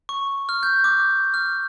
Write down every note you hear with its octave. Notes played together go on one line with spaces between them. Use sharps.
C#6
F6
G6
D6
F6